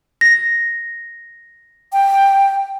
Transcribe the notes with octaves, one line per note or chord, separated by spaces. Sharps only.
A#6
G5